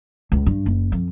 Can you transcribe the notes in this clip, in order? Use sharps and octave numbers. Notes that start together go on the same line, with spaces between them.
C#2
G2
F#1
F2